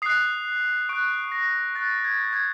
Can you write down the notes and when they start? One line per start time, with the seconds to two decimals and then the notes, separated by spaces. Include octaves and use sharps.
0.02 D#6 F#6 C7
0.89 C#6 F#6 D7
1.32 A#6
1.75 C#6 F#6 A6
2.05 G#6
2.33 G#6